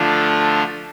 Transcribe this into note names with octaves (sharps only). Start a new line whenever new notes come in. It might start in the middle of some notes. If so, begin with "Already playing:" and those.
Already playing: D3 F3 A3 D4 F4